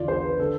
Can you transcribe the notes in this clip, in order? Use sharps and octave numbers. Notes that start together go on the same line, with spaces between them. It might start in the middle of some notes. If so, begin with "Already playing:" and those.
Already playing: E2 D3 F4 D5
C5
B4
D3 A4